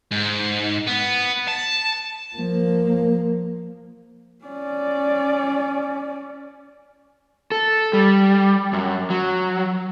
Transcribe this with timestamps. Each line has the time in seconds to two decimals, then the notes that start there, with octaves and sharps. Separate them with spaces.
0.12 G#2
0.87 B3
1.48 A5
2.36 F3 A#3
4.45 C#4 D5
7.52 A4
7.93 G3
8.73 F#2
9.10 F#3